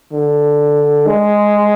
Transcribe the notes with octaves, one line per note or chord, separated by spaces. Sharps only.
D3
G#3